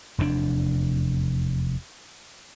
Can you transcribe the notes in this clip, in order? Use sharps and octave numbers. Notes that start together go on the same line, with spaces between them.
F1 E2 G#2 D4